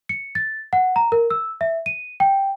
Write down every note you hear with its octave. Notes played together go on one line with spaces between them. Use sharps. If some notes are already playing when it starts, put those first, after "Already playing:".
C#7
A6
F#5
A#5
A#4
E6
E5
D#7
G5